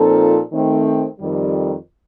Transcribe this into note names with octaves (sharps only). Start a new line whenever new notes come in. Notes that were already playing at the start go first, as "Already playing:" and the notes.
Already playing: A#2 F3 C4 D#4 A4
D#3 A3 C4
F2 D#3 G3